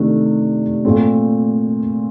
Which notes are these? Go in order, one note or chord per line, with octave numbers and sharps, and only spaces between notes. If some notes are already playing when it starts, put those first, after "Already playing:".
Already playing: C3 D#3 A3 D4
A#2 A3 C4